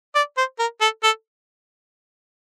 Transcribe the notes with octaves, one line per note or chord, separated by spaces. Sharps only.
D5
C5
A#4
A4
A4